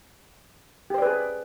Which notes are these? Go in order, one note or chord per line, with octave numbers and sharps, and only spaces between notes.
G4 G#4 B4 C5 D5